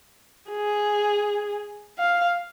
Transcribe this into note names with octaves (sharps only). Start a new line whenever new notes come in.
G#4
F5